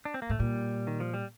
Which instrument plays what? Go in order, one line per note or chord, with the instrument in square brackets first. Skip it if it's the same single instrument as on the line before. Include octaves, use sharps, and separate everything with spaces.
[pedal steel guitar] D4
C4
A#3
[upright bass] A2 [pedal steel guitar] A3
[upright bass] A#2 [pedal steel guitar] G3
[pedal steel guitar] D#3
F3
G3